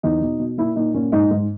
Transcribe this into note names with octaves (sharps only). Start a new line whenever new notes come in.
E2 D#4
B2
B2
A#2 E4
A#2 D#4
A#2 C#4
G#2 D#4
G#2